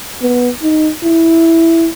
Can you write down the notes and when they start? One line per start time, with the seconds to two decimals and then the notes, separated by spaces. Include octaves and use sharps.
0.22 B3
0.62 D#4
1.03 E4